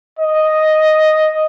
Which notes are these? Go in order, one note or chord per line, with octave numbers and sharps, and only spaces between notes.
D#5